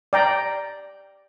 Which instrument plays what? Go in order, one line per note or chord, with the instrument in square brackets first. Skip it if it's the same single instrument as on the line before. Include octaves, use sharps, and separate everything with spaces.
[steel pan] D5 G5 A#5